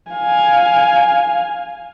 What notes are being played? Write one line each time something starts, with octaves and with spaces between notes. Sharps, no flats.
F5 G#5